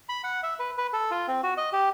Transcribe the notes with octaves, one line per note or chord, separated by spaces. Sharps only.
B5
F#5
E5
B4
B4
A4
F4
C4
F#4
D#5
G4